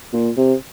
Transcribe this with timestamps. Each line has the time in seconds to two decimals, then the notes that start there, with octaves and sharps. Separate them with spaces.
0.13 A#2
0.37 C3